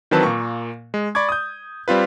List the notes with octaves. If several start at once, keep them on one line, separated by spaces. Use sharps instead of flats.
D#3 E3 F#3 C4 B4 A5
A#2 A#3 C#6
G#3
D5 B5 C#6 D6 G#6
D#6 G6
G3 C4 F4 B4